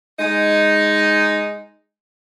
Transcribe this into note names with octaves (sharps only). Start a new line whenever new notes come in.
G#3 D#4